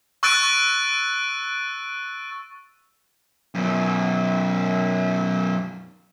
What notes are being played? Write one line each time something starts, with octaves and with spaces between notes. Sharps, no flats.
C#6 E6 F#6 A6 D7 D#7
F#2 B2